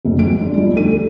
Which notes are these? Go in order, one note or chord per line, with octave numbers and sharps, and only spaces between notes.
F#1 D2
F#3 G#3 D7
G#3 D4
F3 G3
D2 D#4 A4 D#7
G4 A4